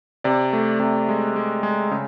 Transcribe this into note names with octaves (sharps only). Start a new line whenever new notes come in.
C3 D5
A3
C3
G#3
G#3
G#3
C#3